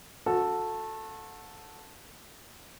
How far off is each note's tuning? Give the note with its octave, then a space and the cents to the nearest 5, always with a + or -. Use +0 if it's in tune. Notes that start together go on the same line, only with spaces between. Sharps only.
F#4 -30 A4 +0